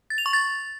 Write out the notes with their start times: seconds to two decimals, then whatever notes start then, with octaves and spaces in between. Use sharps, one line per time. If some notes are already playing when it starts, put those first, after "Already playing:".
0.10 A6
0.18 F7
0.26 C#6
0.33 A6